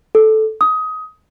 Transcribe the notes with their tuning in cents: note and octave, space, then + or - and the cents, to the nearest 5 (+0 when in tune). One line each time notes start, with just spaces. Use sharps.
A4 -10
D#6 +20